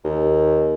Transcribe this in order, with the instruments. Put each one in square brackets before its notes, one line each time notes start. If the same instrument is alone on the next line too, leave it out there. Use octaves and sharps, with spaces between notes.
[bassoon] D#2